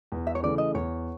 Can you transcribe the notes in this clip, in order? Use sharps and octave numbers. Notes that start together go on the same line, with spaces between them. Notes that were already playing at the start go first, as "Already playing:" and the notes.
E2
E5
C#5
C#3 E3 A3 D5
D#5
E2 C#5